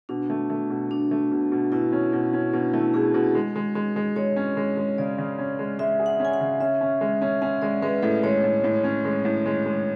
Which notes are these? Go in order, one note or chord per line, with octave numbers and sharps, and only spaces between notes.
B2 D4
A3
A3
B2
B2 D4
A3
B2
B2
B2 E4
C#4
B2 E4
C#4
B2 D4
A3 E4
B2 G#4
B2
G#3
G#3
G#3
G#3
G#3 C#5
C#4
G#3
G#3
C#3 D5
C#3
C#4
G#3
G#3 E5
G#4
F#5
C#4 G#5
F#5
C#3
C#4 E5
C#4
G#3
C#4
C#4 F#5
G#3 D5
G#3 B4
A2 A4
G#3 C#5
A2
A2
C#4
G#3
A2
G#3
G#3